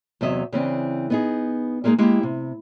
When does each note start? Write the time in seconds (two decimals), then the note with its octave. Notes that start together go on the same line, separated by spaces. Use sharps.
0.21 E2 C3 F#3 D#5 E5
0.52 C#3 E3 C4 D4
1.10 B3 D#4 G#4
1.84 G3 G#3 A#3 D#4 G#4
1.98 G#3 A#3 E4 G4
2.23 C3